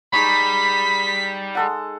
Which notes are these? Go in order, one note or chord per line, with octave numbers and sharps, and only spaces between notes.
G3 D#4 G#4 B5 C#6 B6
G#3 A4 F#5